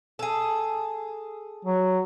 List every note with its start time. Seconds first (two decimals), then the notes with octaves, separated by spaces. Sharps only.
0.19 G#4 A4
1.65 F#3